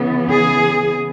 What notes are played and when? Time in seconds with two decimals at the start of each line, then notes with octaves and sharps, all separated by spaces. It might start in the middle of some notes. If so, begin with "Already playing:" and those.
Already playing: C#3 E3 B3
0.28 G#4